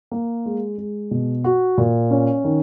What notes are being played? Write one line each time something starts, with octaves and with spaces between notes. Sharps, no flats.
A#3
G#3
G#3
B2
F#4
A#2
C#4
D#3